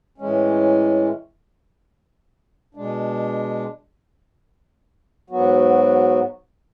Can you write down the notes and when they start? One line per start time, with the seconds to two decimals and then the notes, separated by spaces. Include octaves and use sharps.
0.18 A2 E3 G#3 C#4
2.75 B2 G#3 D4
5.30 G#2 F#3 B3 F#4